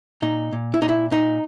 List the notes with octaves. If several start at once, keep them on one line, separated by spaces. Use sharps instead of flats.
A#2 D#4
A#2
E4
A#2 D#4
E4
A#2 D#4